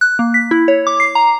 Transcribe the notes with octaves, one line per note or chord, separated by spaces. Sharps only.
F#6
A#3
B6
E4
C#5
D6
C7
A#5